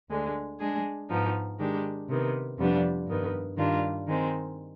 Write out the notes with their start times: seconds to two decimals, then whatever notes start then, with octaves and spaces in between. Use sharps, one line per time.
0.10 D2 D3 G#3
0.60 G#3 D4 G#4
1.09 G#2 F3 B3 D#4
1.59 D#3 G#3 D4 G4
2.09 C3 D#3 B3
2.58 F2 C3 G3 B3 D4
3.08 G2 D#3 B3
3.57 G2 D#3 G3 D4 F4
4.07 D#3 G#3 C4